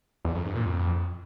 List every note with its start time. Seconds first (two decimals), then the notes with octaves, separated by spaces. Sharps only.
0.25 E2
0.35 F2
0.45 G2
0.55 A#2
0.65 F2